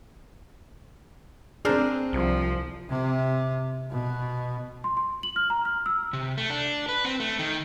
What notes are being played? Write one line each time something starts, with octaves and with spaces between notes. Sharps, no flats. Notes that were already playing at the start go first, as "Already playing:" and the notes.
C4 D4 G#4 A#4 C5
C2 F3
C3
B2
C6
C6
F#7
F6
A#5
F6
E6
C3
A3
D4
B4
C4
A3
D#3